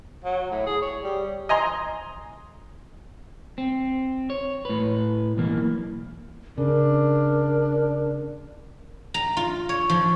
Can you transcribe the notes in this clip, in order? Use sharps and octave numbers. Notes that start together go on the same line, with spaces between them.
F#3
A2
G#4
C#5
G3
D#5 G#5 A#5 C6
C4
C#5
A2 B4
B1 E3 A#3
C#3 D4 A#4
A#5
F4
C#5
F3